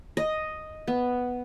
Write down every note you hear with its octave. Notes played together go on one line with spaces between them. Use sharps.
D#5
B3